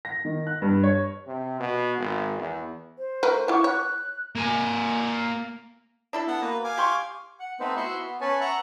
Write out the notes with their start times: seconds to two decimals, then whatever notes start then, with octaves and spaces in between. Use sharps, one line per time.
0.05 A#6
0.25 D#3
0.47 F#6
0.62 G2
0.83 C#5
1.27 C3
1.60 B2
1.98 G#1
2.38 E2
2.97 C5
3.23 A3 A#4 B4
3.48 F3 E4 F#5 C#6 D6
3.64 C#5 F#6
4.36 A#3 G#5
6.13 D4 E4 A4
6.28 B3 F#5 A5
6.42 B2 A#3 B4
6.64 F5 G#5 D6
6.78 G4 C6 C#6
7.40 F#5
7.60 A3 B3 C4 D#4 B4 C5
7.77 E4 F#4 E5 C6 C#6
7.98 B3
8.21 C#4 B4 C#5 G#5 A5
8.40 E5 F#5 A#5 F#6